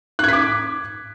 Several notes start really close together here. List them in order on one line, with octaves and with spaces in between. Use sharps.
F#6 G#6 B6 D6